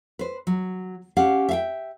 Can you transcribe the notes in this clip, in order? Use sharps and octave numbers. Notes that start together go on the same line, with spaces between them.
B4 C5
F#3
C#4 G4 F5 F#5
E5 F5 G5